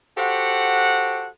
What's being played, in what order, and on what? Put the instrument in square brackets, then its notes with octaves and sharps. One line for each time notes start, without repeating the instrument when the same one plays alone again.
[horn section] F#4 G4 A4 C5 F#5